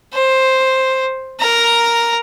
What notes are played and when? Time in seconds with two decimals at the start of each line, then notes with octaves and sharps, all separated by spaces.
0.13 C5
1.40 A#4 A#5